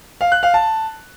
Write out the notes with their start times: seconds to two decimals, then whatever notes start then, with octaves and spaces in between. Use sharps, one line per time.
0.21 F5
0.32 F#6
0.43 F5
0.54 A5